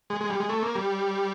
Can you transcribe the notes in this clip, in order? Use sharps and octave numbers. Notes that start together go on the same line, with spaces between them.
G#3
G#3
G3
G#3
A3
A#3
G3